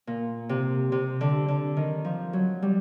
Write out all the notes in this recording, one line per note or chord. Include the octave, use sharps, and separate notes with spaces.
A#2
C3
C3
D3
D3
D#3
F3
F#3
G3